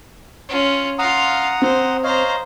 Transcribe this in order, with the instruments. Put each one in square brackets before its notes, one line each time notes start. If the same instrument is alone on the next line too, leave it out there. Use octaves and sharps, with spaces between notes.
[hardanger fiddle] C#4 F4
[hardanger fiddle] F4 F5 [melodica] F#5 A#5 D#6
[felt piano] C4 [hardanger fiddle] C5
[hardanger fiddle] C5 A#5 [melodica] C#5 D#5 F5